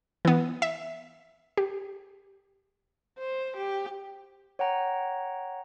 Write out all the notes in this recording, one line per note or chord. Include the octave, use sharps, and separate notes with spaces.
E3 B3
E5
G4
C5
G4
C#5 F#5 G5 A#5